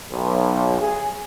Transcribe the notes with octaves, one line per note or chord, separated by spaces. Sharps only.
B1
G#4